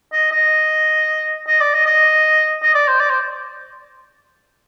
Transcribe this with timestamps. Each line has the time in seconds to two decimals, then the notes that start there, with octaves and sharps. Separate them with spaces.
0.12 D#5
0.31 D#5
1.47 D#5
1.60 D5
1.73 D#5
1.86 D#5
2.63 D#5
2.74 D5
2.88 C5
3.00 D5
3.09 C5